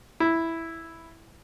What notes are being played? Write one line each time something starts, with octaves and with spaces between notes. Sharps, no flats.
E4